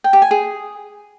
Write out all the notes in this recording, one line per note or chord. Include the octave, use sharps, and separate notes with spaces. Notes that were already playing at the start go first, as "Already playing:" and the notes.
G5
G4
G#5
G#4